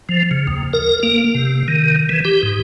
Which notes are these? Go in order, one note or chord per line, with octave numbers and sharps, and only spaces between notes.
F3
C#3
D#2
A#4
A#3
C3
D#3
E3
G4
G#2